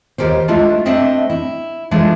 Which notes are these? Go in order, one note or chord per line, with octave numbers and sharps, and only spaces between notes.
D#2 G4 A#4 C5
G#3 A3 D4 E4 F4
A3 C4 D4 D#5 E5
E4
E3 F3 G#3 A3 D4